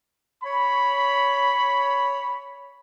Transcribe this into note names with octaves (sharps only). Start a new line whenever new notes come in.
C#5 B5